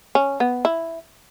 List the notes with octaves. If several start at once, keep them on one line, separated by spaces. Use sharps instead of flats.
C#4
B3
E4